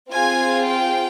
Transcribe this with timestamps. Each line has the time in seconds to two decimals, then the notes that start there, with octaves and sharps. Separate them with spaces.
0.11 C4 F4 G#4 G#5
0.66 G5